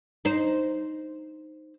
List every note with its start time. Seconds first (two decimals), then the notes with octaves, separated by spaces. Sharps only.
0.25 D#4 C5